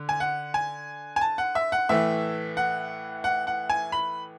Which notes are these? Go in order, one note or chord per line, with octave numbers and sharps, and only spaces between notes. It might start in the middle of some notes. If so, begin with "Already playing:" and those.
Already playing: D3
G#5
F#5
G#5
G#5
A5
F#5
E5
F#5
A2 E3 A3 E5
F#5
F#5
F#5
G#5
B5